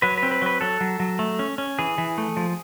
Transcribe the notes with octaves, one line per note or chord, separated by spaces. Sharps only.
F#3 B4
B4
C4
B4
F#3 B4
F#3 A4
F#3
F#3
A3
C#4
C#4
E3 G#4
E3
A3
F3